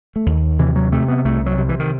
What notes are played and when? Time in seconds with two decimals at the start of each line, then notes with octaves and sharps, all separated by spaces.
0.16 A3
0.26 D#2
0.59 C3 E3
0.76 F#3
0.92 C3 A3
1.08 B3
1.25 C2 A3
1.46 F#3
1.58 C3
1.69 E3
1.79 D#3